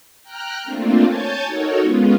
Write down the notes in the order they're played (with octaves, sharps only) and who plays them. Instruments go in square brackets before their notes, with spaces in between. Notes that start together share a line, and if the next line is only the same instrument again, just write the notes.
[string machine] G5 A#5 F6 F#6
A3 A#3 C4 D4 F4
C#5 G#5 A5 G6 A6
D#4 F#4 A4 A#4 C#5
G#3 B3 C#4 F4